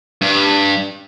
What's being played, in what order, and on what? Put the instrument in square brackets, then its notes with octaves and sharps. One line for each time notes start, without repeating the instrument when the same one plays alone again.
[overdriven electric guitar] G2